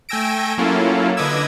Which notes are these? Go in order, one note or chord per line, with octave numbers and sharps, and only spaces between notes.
A3 G5 G#5 E6 A#6 D7
F#3 A#3 C#4 E4 F4 A4
D3 B4 D#5 D6 E6 G#6